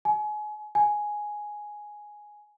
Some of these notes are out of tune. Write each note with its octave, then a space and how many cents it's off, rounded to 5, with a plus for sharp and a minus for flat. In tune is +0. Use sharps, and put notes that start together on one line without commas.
G#5 +30
G#5 +5